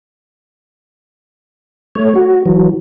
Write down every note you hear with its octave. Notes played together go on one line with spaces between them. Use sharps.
A3 C#5
F#4
E3 F#3